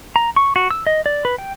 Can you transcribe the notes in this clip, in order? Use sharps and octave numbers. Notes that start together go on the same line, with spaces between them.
A#5
C#6
F#4
E6
D#5
D5
B4
G5